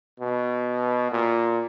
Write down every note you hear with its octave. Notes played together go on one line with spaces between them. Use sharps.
B2
A#2